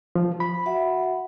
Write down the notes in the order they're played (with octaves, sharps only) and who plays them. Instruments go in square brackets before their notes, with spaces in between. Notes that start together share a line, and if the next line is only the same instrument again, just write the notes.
[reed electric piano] F3
B5
[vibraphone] F#4 E5 F#5